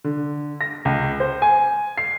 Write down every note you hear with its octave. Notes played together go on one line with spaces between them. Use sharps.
D3
A#6
C#2
C5
G#5
C7